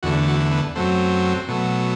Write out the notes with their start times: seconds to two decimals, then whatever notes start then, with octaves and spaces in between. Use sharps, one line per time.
0.03 E2 D3 A3 F#4
0.28 F#4
0.52 B3
0.75 F#2 F#3 A3 C4
1.48 B2 F#3 A3